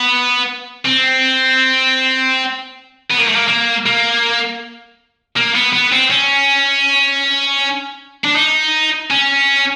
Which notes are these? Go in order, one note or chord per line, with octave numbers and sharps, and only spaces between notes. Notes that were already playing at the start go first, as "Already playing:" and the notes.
Already playing: B3
C4
B3
A#3
A3
A#3
A#3
A#3
A#3
B3
B3
C4
C#4
D4
D#4
C#4